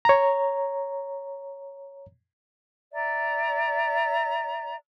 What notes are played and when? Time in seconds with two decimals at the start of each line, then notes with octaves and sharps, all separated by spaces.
0.05 C#5 A#5
2.94 D5 E5 A#5